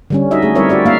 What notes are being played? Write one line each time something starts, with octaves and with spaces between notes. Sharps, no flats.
D3 G3 C#4
D#4 F#4 D#5 E5
A3 G#4
G3 C4 E4 A#4 C#5 E5
F#4 D5 E5
A#3 E5 F5